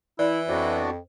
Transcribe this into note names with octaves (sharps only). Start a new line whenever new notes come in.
E3 E4 D5
F2 B3 D4 F#4 C5